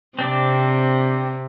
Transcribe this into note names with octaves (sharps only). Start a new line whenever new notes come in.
C3 C4 D4 D5